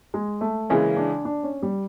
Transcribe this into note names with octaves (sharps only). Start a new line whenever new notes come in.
G#3
A3
C#3 E3 G#3 A#3 C#4
D4
D4
C#4
G3